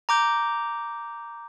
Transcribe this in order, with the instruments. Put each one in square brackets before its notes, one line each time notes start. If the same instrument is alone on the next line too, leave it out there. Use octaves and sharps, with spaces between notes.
[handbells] A#5 D6 G6